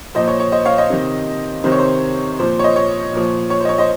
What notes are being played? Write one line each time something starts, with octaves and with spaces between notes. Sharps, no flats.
A#2 F3 C5 D#5
C#5
C#5
C5 D#5
C#5 F5
C5 D#5
C3 D#3
C3 D#3 C5
C#5
C5
A#2 F3 C5
C#5
C5 D#5
C#5
A#2 F3
C#5
C5
D#5
C#5
C5 D#5